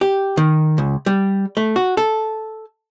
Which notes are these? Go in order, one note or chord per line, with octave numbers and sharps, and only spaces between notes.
G4
D#3
C#2
G3
A3
F#4
A4